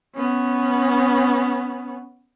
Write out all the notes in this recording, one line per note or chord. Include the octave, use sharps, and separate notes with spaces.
B3 C#4